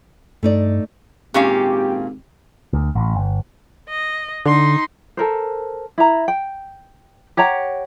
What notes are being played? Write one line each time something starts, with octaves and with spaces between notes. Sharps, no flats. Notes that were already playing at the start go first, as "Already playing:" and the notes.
G2 A3 D#4 D5
G#1 A#2 C#4 G4 F5
D2
A1
G1
D#5
D3 D#4 C6
A4 A#4 C5
E4 A#5
G5
G4 C#5 F#5 A#5